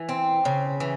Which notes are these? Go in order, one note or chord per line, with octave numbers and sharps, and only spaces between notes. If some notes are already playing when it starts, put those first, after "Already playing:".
Already playing: E3
C4
C#3
E3